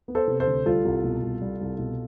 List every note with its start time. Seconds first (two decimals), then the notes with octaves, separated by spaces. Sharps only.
0.08 B3
0.15 A4 C5
0.27 C3
0.40 A4 C5
0.47 D2
0.66 G3 F4 A4
0.85 C2
1.04 B2
1.22 C2
1.41 G3
1.61 C2
1.79 B2